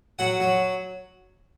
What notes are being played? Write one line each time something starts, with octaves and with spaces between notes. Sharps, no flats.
F#3 F#5
F#3